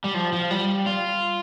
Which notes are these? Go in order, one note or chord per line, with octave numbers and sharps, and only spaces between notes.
G3
F3
F3
G3
F4